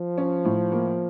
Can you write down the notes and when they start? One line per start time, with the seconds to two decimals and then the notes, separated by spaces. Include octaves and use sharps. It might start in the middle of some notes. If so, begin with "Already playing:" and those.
Already playing: F3
0.18 C#4
0.45 A2
0.72 A#3